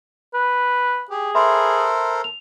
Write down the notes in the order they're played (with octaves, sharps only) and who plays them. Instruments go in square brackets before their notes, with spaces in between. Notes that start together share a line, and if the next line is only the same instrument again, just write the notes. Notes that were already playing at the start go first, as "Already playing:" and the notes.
[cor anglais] B4
[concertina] G4 [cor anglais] G#4
[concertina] A4 A#4 C5 [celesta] E5 B5 C6
[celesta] F7